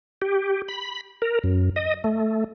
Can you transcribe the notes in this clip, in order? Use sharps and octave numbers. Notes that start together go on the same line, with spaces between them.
G4
B5
A#4
F#2
D#5
A3